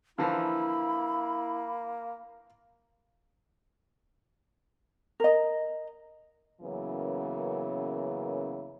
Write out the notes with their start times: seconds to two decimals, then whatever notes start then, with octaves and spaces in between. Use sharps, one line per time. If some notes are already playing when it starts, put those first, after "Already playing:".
0.18 D3 E3 F3 A#3 E4 B5
5.20 A#4 D#5
6.61 F#2 C#3 E3 F#3 A#3 B3